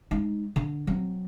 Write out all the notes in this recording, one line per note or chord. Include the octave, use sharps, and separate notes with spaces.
G#3 D#4
D3
F#3 C4